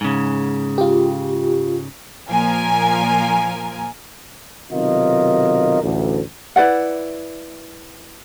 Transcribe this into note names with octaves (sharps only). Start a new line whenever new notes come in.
G#2 C#3
F4 G4
A#2 F3 A#4 G#5
B1 C3 D#3 F4 A#4 D#5
A1 D2
E4 B4 D5 F#5